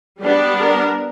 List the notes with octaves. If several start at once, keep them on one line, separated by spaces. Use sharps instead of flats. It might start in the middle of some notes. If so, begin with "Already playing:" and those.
G3 B3 D4 G4
A#4